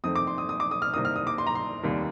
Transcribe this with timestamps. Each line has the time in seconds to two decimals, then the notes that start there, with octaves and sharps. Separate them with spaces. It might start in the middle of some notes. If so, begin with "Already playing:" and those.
0.04 F2 D#3 A3 C4 D#6
0.16 D6
0.27 C6
0.38 D#6
0.49 D#6
0.60 D6
0.71 D#6
0.82 F6
0.93 C2 C3 D#3 A#3 D#6
1.05 F6
1.16 D#6
1.27 D6
1.38 C6
1.47 A#5
1.55 C6
1.83 F1 D#2 D#3 G3 A#3